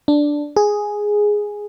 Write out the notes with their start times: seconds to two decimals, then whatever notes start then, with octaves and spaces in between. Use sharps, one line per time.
0.08 D4
0.56 G#4